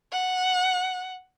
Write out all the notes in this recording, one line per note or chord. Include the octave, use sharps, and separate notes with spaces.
F#5